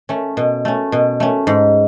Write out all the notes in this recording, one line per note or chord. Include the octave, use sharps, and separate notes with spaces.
A3 C#4
B2
A3 C#4
B2
A3 C#4
G#2